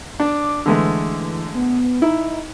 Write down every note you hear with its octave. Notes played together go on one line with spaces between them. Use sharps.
D4 D6
D3 E3 G#3 A3
B3
D#4 E4